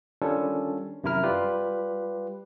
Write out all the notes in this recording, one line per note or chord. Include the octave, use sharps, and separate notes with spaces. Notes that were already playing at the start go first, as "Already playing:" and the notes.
D#3 G3 C#4 D4 F4 A4
F#2 C3 D#3 E4 A#4 F6
G3 F4 G4 B4